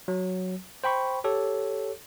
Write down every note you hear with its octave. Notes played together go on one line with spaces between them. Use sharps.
F#3
C5 G5 B5 C#6
G4 A4 C#5